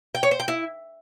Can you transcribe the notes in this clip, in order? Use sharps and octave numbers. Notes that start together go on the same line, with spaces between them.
G5
C#5
C5
G5
E4